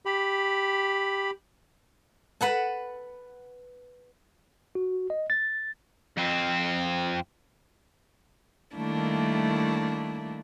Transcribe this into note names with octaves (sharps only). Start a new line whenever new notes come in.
G4 B5
B4 F#5 A5
F#4
D#5
A6
F2 C4
D#3 G3 A3 A#3 D4 E4